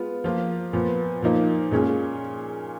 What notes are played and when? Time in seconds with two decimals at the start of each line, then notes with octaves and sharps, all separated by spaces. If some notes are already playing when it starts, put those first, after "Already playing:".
Already playing: G#3 B3 F4
0.24 F3 A#3 F4
0.73 A#2 F3 B3
1.22 A#2 F3 A#3 D#4
1.71 A#2 G#3 C#4 F4 G#4